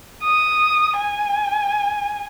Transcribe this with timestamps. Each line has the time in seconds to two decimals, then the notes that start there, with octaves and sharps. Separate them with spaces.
0.23 D#6
0.98 G#5